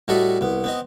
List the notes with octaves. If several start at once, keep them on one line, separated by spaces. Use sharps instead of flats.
A2 G3 F#4 A4 D#5 B5
C2 B3
B3 C4 D#5